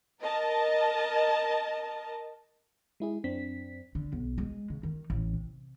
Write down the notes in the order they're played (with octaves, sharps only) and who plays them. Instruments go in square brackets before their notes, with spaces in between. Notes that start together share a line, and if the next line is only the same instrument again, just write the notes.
[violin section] A#4 D#5 A5
[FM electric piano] G#3 E4 G#4
F#2 C4 D4 B6
[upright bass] D3
B1
G#3
C#3
D#3
A1
C3